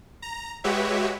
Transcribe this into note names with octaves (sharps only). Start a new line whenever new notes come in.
A#5
G#3 F#4 G4 B4 C#5 E5